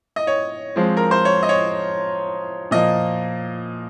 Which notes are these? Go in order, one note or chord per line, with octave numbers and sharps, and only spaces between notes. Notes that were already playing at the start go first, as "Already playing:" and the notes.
D#5
C#5
F3 G#3 C4
A#4
C5
C#5
D#5
C#5
A#2 F3 A#3 D#5